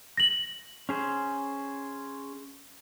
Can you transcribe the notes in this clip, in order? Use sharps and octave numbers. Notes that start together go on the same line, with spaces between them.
A#6 F#7
C#4 G#4 C5